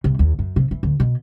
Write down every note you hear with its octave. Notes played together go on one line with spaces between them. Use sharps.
C2
D#2
F#2
C3
E3
D2
B2